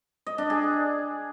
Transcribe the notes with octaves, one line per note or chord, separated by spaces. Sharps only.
D#5
D4
G#4